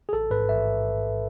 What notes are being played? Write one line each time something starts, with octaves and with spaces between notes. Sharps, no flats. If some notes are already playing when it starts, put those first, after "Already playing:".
G#4
A1 A4
G#2 B4
A1 E5